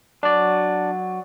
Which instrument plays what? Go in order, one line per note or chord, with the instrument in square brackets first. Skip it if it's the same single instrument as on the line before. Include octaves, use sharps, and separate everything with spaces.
[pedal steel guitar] F#3 [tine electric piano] D4 D5